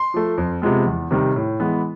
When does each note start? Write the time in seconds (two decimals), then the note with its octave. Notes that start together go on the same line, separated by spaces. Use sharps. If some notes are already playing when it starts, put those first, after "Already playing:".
Already playing: C6
0.14 F3 A3
0.38 F2
0.62 C3 F3 G#3 B3
0.86 E2
1.11 C3 D#3 G3
1.36 A2
1.60 E3 G#3 B3